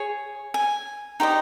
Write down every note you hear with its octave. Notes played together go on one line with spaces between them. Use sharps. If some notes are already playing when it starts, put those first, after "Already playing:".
Already playing: G#4 C#5
G#5
D#4 G4 C5 D#5